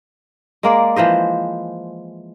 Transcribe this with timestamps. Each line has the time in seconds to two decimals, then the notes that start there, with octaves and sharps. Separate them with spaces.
0.63 G#3 A#3 D5
0.96 E3 F3 C5 D#5